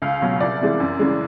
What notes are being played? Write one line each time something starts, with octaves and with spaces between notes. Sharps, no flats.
C#2 F5
B2 F#3
C2 D5
C3 E3 G#3
F#2
C#3 E3 G#3